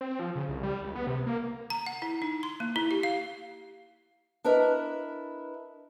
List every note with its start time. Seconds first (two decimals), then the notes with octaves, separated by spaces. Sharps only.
0.01 C4
0.19 F3
0.36 C#3
0.49 C2
0.63 G3
0.84 C#2
0.95 B3
1.07 C3
1.27 A#3
1.70 A#5
1.86 F#5
2.02 E4
2.22 D#4
2.43 C6
2.60 A#3
2.76 E4
2.91 G4
3.03 F5
4.44 D4 E4 A#4 B4 D#5